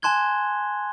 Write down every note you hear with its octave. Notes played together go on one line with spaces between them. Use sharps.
G#5 A5 C6 F#6 G#6 G7